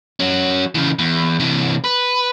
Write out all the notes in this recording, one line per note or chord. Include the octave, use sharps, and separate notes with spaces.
F#3 C#4
C#3 E3
E2
C3 E3
B4